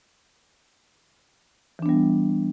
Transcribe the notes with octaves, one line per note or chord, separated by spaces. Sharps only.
E3 G3 B3 D4